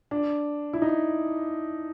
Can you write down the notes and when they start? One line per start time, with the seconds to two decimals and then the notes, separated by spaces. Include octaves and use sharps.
0.11 D4
0.73 E4
0.82 D#4